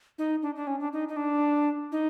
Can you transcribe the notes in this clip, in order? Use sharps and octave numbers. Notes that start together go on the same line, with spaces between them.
D#4
D4
D4
C#4
D4
D#4
D#4
D4
D#4